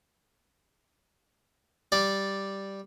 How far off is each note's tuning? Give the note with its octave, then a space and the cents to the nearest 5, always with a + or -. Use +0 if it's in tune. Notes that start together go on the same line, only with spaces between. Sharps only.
G3 +0 D5 +0